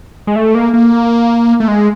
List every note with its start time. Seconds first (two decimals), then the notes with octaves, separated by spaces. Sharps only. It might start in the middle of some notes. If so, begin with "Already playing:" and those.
0.27 G#3
0.36 A3
0.55 A#3
0.74 A#3
1.60 A3
1.68 G#3